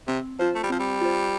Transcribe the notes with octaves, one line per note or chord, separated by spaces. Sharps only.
C3 C4
F3 F4 C5
A3
G3
F3 C4
G3
F4 C5